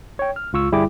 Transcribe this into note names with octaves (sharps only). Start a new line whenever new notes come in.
C#5 G5
F6
C#2 F4 C#6 E6
G1 G3 E4 G#4 G5 D6